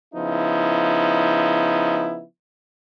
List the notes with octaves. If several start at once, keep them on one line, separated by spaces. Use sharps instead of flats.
C#3 F3 B3 D#4 E4